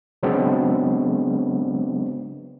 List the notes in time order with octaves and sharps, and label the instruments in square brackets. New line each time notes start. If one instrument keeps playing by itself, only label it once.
[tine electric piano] C#3 F#3 G#3 B3 C4 D4